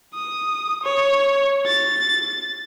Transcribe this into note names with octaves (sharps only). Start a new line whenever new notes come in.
D#6
C#5
A6